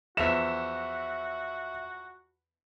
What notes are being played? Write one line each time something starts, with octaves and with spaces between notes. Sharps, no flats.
E2 F3 F#4 E5 B6 E7